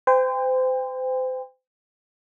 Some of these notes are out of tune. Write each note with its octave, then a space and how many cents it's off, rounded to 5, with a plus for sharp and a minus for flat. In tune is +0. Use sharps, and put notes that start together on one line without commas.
C5 -35 G5 +30